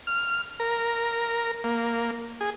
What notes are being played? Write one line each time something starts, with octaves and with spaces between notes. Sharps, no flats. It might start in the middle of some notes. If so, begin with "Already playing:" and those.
F6
A#4
A#3
G#4